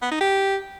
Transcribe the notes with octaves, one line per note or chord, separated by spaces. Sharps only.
B3
D#4
G4